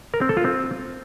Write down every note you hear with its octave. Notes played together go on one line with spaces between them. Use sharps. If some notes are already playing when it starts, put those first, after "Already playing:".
A#4
C4
A4
F4
C4